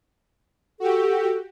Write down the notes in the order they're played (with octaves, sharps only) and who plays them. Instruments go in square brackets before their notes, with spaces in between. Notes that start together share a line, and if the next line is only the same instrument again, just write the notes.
[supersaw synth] F#4 G4 [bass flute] A4